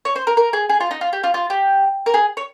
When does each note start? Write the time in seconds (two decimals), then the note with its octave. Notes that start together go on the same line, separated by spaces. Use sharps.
0.05 C#5
0.16 C5
0.27 A#4
0.37 A#4
0.53 G#4
0.69 G#4
0.80 F4
0.91 D#4
1.01 F4
1.13 G4
1.23 F4
1.34 F4
1.50 G4
2.06 A#4
2.14 G#4
2.37 C#5